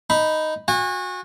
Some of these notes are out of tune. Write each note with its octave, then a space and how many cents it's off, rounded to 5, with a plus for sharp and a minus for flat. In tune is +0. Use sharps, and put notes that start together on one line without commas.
D#4 +0 B5 +0
F#4 -25 G#5 -35